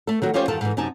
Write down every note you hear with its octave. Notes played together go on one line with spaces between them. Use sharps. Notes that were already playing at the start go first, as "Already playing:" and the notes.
A3 A4
D#3 F#3 F#4
F3 C#4 F4 G4 C5 C#5
E2 G2 D#3 F4 A4 A5
G#2 E3
F#2 C3 D#4 G#5 A5